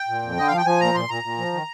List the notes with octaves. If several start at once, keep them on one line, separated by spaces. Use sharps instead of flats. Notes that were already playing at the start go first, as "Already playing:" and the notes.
Already playing: G5
A#2
F2
D3 D#5
F3 F5
G5
F3 G#5
A#2 A#5
A#2 C6
A#2 A#5
A#2
F3
D#3